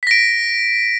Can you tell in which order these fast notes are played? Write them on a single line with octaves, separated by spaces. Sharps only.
B6 A#6 D7